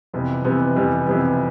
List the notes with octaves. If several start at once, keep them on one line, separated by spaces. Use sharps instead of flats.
F2 C3 E3 G3 B3
F2 C3 E3 G3 B3
F2 C3 E3 G3 B3
F2 C3 E3 G3 B3